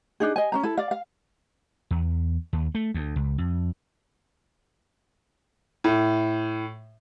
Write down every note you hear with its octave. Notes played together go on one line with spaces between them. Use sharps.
D4 D#4 G#4
D#5 G#5
C#4 D4 A#5
E4 A4
D5 F5
F5
E2
D#2
A3
D2
C#2
F2
A2